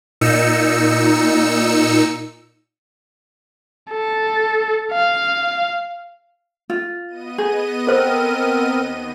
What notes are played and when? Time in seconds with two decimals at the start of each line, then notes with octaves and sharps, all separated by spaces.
0.21 A#2 D#4 E6 C#7
3.91 A4
4.92 F5
6.70 F4
7.07 B3 D#5 D#7
7.38 G#4
7.87 C4 A4 A#4 C5
8.70 D#2